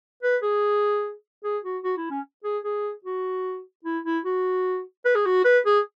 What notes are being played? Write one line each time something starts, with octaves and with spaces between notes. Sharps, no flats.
B4
G#4
G#4
F#4
F#4
E4
C#4
G#4
G#4
F#4
E4
E4
F#4
B4
G#4
F#4
B4
G#4